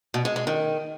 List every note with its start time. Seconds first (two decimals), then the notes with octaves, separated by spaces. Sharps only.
0.14 B2
0.25 G#3
0.36 G#3
0.47 D#3